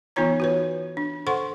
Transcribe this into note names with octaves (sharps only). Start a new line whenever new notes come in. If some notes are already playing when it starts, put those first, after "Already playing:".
E3 B3 D#4 F4 C#5 A#5
F#4 B4 C#5
D4
A4 C5 F#5 C6 C#6